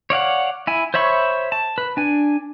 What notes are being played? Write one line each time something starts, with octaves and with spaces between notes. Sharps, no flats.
C#5 D5 F5 F#5
E4 G#5
C5 C#5 E5 B5 C#6
A5
B4
D4 G#5